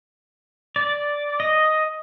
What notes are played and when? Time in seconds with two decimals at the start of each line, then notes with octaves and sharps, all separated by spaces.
0.76 D5
1.40 D#5